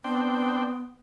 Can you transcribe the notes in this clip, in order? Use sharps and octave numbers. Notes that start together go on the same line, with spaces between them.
B3 C4 D4 G5